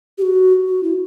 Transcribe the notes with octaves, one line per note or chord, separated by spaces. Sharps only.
G4
F#4
F#4
E4